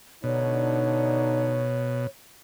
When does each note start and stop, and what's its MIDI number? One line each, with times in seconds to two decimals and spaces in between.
0.24 2.07 47
0.24 1.66 50
0.24 1.66 62
0.24 1.66 63
0.24 2.08 73